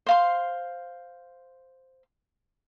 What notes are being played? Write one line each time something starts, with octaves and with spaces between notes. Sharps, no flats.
C5 F5 C6